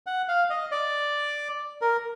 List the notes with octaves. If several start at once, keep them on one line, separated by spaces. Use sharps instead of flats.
F#5
F5
D#5
D5
A#4